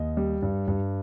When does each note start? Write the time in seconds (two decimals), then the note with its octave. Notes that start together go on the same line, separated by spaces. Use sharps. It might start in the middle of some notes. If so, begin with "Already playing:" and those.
Already playing: D#2 D#5
0.17 G3
0.42 G2
0.68 G2